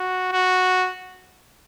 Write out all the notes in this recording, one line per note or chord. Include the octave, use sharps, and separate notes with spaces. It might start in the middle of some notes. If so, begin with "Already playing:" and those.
Already playing: F#4
F#4